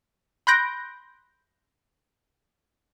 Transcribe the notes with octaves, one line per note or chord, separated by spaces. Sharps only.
B5 C6 F#6 G6 A#6 D7